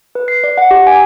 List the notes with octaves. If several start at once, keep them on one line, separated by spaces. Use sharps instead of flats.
B4
C7
D5
F#5
G4
G#5